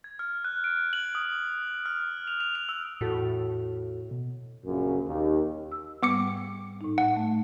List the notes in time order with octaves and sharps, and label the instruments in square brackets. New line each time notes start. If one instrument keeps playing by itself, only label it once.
[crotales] G#6
F6
F#6
D7
F#7
D#6
F6
F7
F7
F7
E6
[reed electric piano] E2 F#4 A4 [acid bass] A2
[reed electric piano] B2
[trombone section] A#1 F#2 C#3 C#4
D#2
[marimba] E6
[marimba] G#2 G3 [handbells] B3 D6 C#7
[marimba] A2 D#4
[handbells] F#5
[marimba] A3